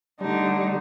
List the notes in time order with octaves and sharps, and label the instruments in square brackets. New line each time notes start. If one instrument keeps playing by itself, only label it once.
[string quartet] D3 [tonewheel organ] G3 [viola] A3 D#4